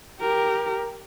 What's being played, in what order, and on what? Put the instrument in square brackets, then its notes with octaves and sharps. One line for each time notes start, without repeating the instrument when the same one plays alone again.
[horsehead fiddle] G4 A#4